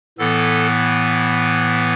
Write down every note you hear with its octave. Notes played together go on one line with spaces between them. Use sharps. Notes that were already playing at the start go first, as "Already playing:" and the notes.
A2 E3 B3 A4